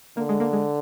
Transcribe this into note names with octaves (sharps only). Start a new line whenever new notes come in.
D3 A#3
G#3
A#3
G#3